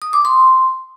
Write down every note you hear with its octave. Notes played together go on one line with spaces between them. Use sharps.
D#6
D6
C6